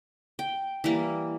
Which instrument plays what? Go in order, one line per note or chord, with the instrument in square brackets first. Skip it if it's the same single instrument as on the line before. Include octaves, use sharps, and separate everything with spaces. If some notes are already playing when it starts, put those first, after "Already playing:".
[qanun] G5
E3 G3 A#3